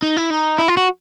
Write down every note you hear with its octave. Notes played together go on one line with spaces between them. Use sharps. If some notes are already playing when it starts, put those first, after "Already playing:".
D#4
E4
D#4
E4
F4
F#4